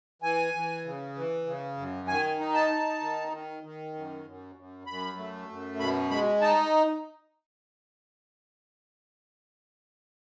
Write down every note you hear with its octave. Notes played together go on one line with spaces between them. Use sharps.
E3 G#5
E3
C#3
E3
C#3
F#2
D#3 G#5
D#4
A5
D#4
D#3
D#3
D#3
F#2
F#2
F#2
F#2 B5
A3
F#2
B2 B5
G#3 B5
D#4 A5